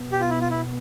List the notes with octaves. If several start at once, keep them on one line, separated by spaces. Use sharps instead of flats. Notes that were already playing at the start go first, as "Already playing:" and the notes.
Already playing: B2 B3
G4
F4
E4
F4
E4